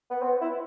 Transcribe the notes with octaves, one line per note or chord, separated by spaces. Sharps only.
B3
C4
E4